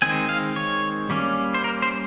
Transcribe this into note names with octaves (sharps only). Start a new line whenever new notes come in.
D#3 G#3 C4 G#5
F5
C#5
G3 A#3 C#4
C5
A#4
C5